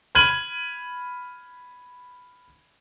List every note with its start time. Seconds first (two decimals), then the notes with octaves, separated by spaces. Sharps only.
0.15 B5 F6 G#6 D#7 F#7